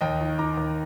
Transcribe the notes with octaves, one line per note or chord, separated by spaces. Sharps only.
D#2 D#5 G5
D#3
D#3 A#5 D6
D#2